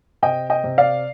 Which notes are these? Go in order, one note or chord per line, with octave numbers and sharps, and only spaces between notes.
C3 D#5 G5
D#5 G5
C3
D5 F5